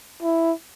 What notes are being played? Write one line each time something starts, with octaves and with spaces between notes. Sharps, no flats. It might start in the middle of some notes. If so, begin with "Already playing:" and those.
E4